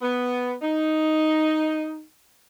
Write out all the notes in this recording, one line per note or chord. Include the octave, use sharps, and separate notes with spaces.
B3
D#4